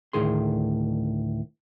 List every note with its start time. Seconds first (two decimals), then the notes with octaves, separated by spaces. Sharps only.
0.13 D2 A2 D#3 G#4 C6